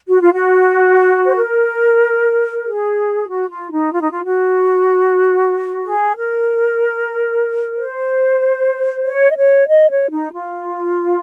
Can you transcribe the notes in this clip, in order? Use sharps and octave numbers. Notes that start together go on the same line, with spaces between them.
F#4
F4
F#4
C5
A#4
G#4
F#4
F4
D#4
F4
D#4
F4
F#4
G#4
A#4
C5
C#5
D#5
C#5
D#5
C#5
D#4
F4